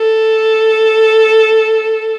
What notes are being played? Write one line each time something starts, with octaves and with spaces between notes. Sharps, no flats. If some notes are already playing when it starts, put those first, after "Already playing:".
Already playing: A4